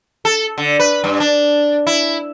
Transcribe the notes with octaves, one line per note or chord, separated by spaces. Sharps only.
A4
D3
B4
G2
D4
E4